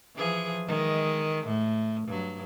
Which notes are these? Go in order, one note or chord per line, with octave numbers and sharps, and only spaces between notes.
E3 F3 G#4
D#3 G#3
A2
G2 F#3